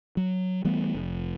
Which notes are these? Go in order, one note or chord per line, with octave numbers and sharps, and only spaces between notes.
F#3
E3 G3 A3 B3
F1